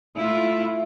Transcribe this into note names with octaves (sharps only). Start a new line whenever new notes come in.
A3 E4 F4